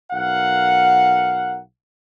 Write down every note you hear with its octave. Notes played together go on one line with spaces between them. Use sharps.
B1 A#4 F5 F#5